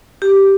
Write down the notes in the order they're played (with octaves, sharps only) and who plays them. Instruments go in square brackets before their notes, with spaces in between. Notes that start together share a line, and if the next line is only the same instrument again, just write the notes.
[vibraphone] G4